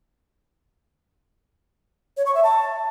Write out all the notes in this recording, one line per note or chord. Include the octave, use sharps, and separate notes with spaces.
C#5
C#6
E5
A5